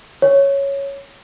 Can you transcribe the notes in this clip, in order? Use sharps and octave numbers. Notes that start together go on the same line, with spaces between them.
C#5